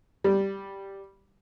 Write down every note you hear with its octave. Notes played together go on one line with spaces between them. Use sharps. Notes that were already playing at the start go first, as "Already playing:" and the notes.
G3